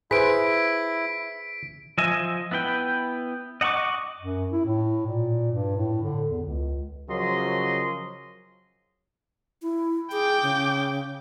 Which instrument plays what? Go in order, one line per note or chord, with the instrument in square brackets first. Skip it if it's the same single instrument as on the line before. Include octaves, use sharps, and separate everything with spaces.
[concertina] E4 [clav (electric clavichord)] G#4 B4 C5 [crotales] B6 D7
[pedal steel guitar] F3 D#5 E5 G#5
B3 E4 B4 G5
D#5 F#5 A5 C#6 D6
[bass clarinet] F#2
E4
A2
A#2
G2
A2
D3
E2
C#2
[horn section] C#3 F3 F#3 A#4 D#5 C6
[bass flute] E4
[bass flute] G#4 [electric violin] G5 D6
[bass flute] C#3